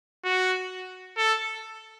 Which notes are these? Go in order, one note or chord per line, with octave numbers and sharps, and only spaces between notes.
F#4
A4